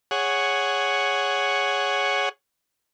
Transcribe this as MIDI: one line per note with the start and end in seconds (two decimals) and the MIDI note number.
0.11 2.29 68
0.11 2.29 73
0.11 2.29 78